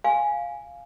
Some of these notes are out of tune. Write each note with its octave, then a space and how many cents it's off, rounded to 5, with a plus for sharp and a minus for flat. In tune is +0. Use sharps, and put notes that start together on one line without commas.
F5 +0 G#5 -5